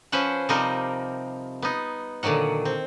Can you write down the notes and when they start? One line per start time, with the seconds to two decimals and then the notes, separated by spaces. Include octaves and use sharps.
0.12 F3 C#4 B4 C5 F#5
0.49 C3 F3 G3 C4 D#4 A#4
1.62 B3 D#4
2.23 A#2 D3 D#3 F#3 F#5
2.65 C4